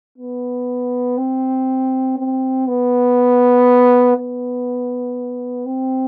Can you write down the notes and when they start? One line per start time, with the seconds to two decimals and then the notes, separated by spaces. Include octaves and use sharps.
0.18 B3
1.18 C4
2.18 C4
2.68 B3
4.17 B3
5.66 C4